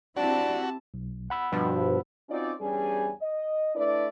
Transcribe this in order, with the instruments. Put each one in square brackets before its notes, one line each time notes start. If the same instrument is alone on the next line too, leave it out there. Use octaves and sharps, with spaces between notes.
[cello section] C4 E4 G4 [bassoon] D4 [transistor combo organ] F#4 [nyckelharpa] A5
[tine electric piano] B1
F#5 B5 E6
[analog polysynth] G2 B2 F3
[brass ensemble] C4 C#4 D#4 F4 F#4 D5
E2 G2 G3 C#4 G#4 G#5
D#5
A3 D4 E4 B4 D5